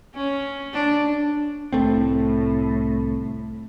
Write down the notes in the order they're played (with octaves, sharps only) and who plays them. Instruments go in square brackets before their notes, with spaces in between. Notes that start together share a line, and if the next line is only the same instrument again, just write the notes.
[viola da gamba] C#4
D4
[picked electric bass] C2 A3 C4 [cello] A2